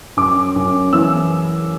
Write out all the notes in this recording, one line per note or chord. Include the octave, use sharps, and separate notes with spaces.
F#2 D6
F#2
E3 E6